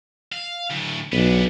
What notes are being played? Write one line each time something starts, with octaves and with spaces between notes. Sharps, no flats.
F5
D2 A2
B1 B3 D4